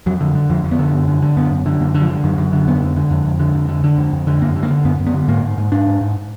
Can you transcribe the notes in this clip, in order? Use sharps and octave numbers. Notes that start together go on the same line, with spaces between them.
F2 F#3
D3
D3
F2 F3
F2
B3
D3
F#2
D3
D3
F#2 B3
F#2
D3
F#2 A#3
D3
F3
D3
F#2 D#3
F#2
D3
F2 B3
D3
D3
F2
F2
D3
F2
D3
D3
F2
F2
D3
F#2 A#3
D3
A#3
D3
F#2 B3
F#2
B3
D3
G#2 A#3
G#2
G#2
G#2 D4
G#2
G#2